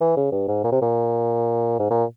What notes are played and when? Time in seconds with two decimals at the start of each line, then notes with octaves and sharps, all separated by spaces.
0.01 E3
0.17 C#3
0.32 G2
0.48 G#2
0.64 A#2
0.72 C3
0.82 A#2
1.79 G#2
1.90 A#2